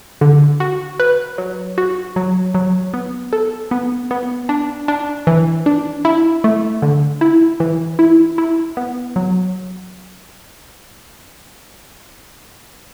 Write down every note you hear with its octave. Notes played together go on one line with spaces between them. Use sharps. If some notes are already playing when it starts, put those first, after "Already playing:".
D3
F#4
B4
F#3
F#4
F#3
F#3
B3
A4
B3
B3
D4
D4
E3
D4
E4
A3
D3
E4
E3
E4
E4
B3
F#3